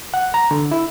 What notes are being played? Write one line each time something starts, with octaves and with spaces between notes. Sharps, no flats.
F#5
A#5
D3
E4